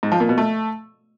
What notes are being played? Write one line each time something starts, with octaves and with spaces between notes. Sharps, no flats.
G#2
F3
A#2
B2
A3